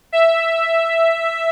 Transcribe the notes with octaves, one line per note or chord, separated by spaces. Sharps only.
E5